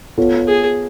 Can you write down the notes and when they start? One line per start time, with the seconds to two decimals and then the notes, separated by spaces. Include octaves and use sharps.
0.18 B3 F4 A4 C#5
0.48 G#4